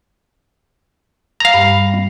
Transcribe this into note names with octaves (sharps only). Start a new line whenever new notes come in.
F5 A#5
G2 G3